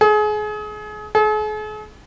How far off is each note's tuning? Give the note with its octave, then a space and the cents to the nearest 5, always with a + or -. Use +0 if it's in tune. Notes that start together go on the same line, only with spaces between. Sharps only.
G#4 +30
G#4 +45